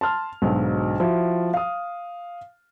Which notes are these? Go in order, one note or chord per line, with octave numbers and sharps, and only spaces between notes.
A5 C6 F6
B1 G#2 D3 F#3
F3 E4 F#4
F5 D#6